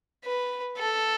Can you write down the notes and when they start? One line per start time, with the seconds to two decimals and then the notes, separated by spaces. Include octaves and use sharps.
0.25 B4
0.78 A4